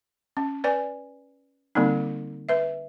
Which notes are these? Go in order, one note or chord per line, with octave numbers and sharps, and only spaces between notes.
C#4
B4 D5 G#5
D3 G3 A#3 C4 D#4
B4 E5